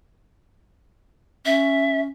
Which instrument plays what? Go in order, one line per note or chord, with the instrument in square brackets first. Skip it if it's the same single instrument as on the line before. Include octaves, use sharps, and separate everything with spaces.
[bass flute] C#4 [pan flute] E5